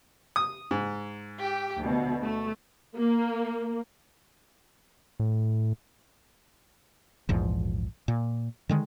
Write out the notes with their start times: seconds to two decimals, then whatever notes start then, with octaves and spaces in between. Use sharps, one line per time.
0.36 D#6
0.71 G#2
1.43 G4
1.79 D2 B2
2.23 A3
2.98 A#3
5.20 A2
7.29 A#1 E2 G#2 F3
8.08 A#2
8.69 D3 D#3 G#3